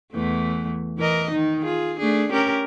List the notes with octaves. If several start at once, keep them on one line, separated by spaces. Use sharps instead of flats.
E2 E3 A3
E3 A#4 D#5
D#3 D#4
F4 G#4
A3 D4 G#4
C#4 G4 A#4